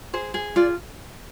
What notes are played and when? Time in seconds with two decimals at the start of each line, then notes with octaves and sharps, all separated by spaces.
0.13 G#4 C5
0.34 G#4
0.56 F4 D5